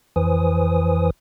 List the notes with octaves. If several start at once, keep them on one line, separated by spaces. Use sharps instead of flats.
F2 E3 B4 C5 G#5 D#6